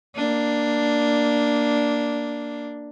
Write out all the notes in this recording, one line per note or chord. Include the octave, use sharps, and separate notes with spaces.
A#3 D4